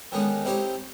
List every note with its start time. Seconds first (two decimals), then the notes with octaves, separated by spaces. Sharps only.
0.12 D3 D#3 G#3 B3 C#4 D#4
0.44 C4 D#4 E4 G4 C5 C#5